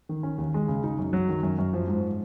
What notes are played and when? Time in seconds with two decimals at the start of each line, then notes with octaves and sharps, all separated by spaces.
0.09 D#3
0.23 C#4
0.38 D#2
0.54 G#3
0.68 C#3
0.84 D#4
0.99 F#2
1.13 F#3
1.29 D#3
1.43 F#2
1.58 F#2
1.73 F3
1.88 G#2